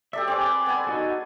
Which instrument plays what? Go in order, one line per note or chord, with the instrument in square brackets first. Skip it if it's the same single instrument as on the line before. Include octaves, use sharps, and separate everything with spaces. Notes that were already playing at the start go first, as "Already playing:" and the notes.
[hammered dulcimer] G4 A4 D5 [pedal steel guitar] E5
[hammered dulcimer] C4 G#4 B4 [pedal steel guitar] D5
[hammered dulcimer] B3 G#5
[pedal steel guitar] D#4 F#4 A4